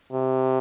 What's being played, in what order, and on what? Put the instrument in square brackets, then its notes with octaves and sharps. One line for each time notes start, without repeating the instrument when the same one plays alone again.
[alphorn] C3